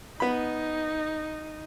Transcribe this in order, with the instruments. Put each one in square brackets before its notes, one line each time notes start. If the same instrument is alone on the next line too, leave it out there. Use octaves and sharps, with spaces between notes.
[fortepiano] B3 B5 [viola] D#4